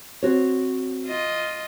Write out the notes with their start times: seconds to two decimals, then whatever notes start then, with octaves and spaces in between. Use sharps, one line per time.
0.23 C4 F#4 C#5
1.06 F4 D#5